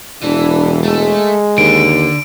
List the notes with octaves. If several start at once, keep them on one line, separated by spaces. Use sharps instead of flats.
E1 E3 D4
G#3 A3 A4
D#2 D3 D7